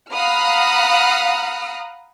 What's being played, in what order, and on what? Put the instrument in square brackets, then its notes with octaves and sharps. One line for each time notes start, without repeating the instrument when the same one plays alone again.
[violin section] F5 F#5 A#5 B5 D#6 F6